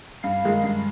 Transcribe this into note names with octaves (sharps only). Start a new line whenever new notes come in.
G2 F5
D#3 G#3
G2